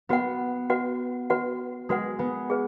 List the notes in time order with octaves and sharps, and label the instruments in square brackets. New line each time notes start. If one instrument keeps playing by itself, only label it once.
[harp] B3 [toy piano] F#4 B4 F#5
[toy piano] F#4 B4 F#5
F#4 B4 F#5
[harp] G#3 [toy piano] F#4 B4 F#5
[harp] B3
[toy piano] G#4 B4